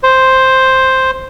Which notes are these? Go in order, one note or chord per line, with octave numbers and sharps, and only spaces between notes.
C5